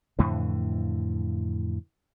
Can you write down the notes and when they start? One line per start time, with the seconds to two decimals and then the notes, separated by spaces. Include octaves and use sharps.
0.19 F2 A2 D3 E3